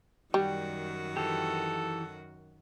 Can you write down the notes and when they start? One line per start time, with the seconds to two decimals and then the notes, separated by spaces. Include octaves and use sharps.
0.34 F#2 D#3 G3 F#4
1.17 E3 G4 A4